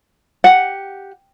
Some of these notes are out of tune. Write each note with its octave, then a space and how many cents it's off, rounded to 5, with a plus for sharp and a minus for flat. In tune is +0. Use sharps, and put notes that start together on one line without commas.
G4 +0 F#5 +0